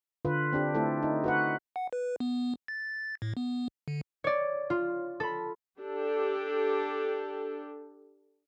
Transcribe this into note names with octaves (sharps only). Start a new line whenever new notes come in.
D3 F4 B4
C4 D4 G4
A3 C4 E4 A4
D#4
F#4 B4 F#5
F#5
B4
B3
A6
A2
B3
D3
C#5 D5
F4
A4 B5
D4 G4 A4